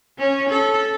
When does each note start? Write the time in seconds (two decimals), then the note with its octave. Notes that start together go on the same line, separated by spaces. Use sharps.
0.18 C#4
0.49 A4